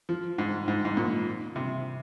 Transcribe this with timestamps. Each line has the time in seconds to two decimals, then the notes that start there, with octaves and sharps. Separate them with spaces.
0.09 F3
0.38 G#2
0.68 G#2
0.85 G#2
0.97 A#2
1.56 C3